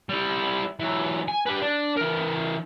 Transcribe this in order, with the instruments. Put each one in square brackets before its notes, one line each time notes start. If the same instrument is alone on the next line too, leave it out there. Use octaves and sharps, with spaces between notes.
[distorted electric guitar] G3 E4
E3 F#3
G#5
G4 B4
D4
E3 A#4